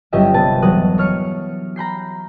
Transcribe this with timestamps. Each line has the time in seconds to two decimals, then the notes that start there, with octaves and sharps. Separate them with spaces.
0.13 G1 F#3 C#4 G4 D#5 E5
0.34 C3 B3 A5
0.62 E1 F#3 D#6 F#6
0.98 C#5 F6 C#7
1.76 A#5 B5 G6 C7